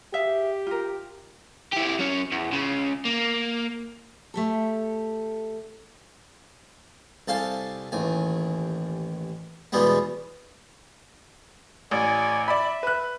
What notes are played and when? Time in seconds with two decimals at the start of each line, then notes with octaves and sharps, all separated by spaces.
0.14 G4 G#4 E5 F5
0.67 F4 A#4
1.73 E4 G4
1.99 F#3 C#4
2.32 E2
2.52 C#2 C#3
3.05 A#3
4.34 A3 G4 A4
7.28 C2 A4 F5 G#5
7.92 A1 D#2 G#5
9.72 E2 B2 G3 G#3 B3
11.91 A1 D5 G#5
12.48 D5 E5 B5
12.83 B4 F#6